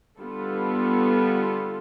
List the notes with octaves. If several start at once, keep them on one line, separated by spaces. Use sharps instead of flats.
D3 G3 B3 F4 A4